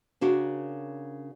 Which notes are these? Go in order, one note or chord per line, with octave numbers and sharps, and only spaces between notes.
C#3 D4 F#4 A#4